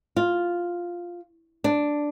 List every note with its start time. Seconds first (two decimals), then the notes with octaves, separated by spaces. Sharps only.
0.16 F4
1.64 D4